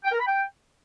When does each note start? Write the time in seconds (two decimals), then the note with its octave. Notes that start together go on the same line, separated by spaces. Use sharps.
0.04 G5
0.12 A#4
0.19 B5
0.27 G5